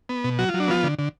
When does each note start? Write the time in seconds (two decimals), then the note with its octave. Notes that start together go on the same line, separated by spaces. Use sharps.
0.09 B3
0.24 B2
0.39 F#3 F#4
0.49 F4
0.54 F#3
0.60 D4
0.68 F3 B3 F4
0.84 D3
0.99 D3